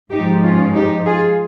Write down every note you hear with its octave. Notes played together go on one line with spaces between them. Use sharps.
G#2 F3 G#3 D#4 G4
C#4 F4
D#4 G4
F4 G#4